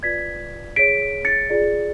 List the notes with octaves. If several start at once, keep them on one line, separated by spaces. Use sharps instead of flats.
F4 B4 D5 G#6 B6
G#4 C#5 B6 D7
A6 C#7
F4 G#4 D5